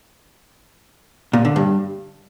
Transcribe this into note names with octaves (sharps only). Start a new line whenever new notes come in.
A#2
D3
G2